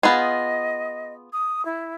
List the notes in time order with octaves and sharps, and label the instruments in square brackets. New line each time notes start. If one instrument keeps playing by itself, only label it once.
[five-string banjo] B3 F4 G#4 [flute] D#5
[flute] D#6
E4